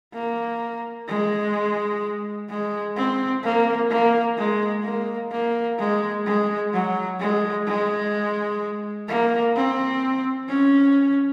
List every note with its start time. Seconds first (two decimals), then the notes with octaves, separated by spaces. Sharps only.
0.14 A#3
1.08 G#3
2.50 G#3
2.97 C4
3.44 A#3
3.90 A#3
4.38 G#3
4.84 A#3
5.32 A#3
5.79 G#3
6.26 G#3
6.73 F#3
7.20 G#3
7.67 G#3
9.09 A#3
9.56 C4
10.49 C#4